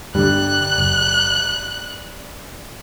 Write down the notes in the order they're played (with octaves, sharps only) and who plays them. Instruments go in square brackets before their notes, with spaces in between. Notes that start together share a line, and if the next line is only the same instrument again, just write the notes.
[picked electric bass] G2 D3 [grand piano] G3 [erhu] F#6
[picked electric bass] F#1